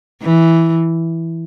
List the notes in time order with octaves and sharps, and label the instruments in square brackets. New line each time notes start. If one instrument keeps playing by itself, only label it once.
[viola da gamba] E3